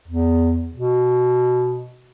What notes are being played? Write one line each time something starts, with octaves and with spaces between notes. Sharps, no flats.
E2
B2